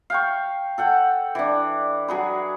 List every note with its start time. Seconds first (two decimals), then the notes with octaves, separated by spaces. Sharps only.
0.10 F5 G5 C#6
0.78 A4 F#5 G5
1.35 E3 D4
2.08 F#3 G#4 B4